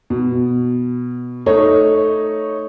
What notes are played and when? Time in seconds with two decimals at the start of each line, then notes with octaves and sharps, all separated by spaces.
0.10 B2
1.46 A3 D#4 C#5